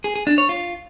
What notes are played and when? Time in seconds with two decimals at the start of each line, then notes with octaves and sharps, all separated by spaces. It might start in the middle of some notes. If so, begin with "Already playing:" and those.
0.04 G#4
0.16 G#4
0.27 D4
0.38 C#5
0.49 F4